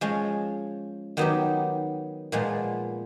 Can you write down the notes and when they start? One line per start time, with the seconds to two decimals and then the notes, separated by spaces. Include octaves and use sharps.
0.01 F3 G#3 C#4
1.17 D#3 F#3 B3 D#4 G4
2.32 A#2 F3 G#3 B3